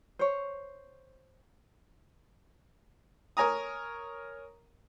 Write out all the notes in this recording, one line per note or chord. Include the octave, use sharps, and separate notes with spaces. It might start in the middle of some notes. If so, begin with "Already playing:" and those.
C5 C#5
A#4 C#5 G#5 A#5 D#6